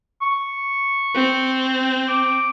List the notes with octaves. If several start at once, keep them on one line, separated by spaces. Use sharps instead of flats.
C#6
C4
D6